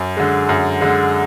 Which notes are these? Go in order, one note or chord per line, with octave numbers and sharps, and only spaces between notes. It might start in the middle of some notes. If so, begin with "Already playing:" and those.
Already playing: F#2
D3 G#3
F#2
D3 G#3